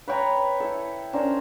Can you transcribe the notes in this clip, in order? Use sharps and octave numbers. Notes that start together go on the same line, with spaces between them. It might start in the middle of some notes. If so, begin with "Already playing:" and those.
B4 C#5 G5 A#5
E4 A4
C#4 D4 A#4 C5